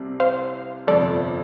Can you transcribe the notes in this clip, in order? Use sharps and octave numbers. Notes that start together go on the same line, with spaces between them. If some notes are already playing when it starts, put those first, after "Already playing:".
Already playing: C2 C3 G3 C4
C5 F5
G1 F2 C3 A4 D5